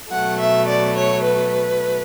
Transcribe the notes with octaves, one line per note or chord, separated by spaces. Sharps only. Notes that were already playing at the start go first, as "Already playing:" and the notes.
B2 F#3 A3 F#5
E5
D5
C#5
B4